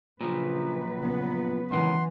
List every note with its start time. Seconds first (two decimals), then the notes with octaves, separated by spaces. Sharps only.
0.21 A#2 C#3 F3 F#3 B4
1.02 B3
1.71 C#2 D#3 E3 F#5 C6